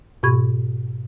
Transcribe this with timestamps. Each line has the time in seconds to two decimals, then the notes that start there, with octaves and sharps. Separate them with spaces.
0.23 G#2 B2 G4 B5 C#6 G#6